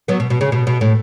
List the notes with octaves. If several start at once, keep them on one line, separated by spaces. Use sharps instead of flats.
F#3 B3
B2
B2
C#3
B2
B2
A2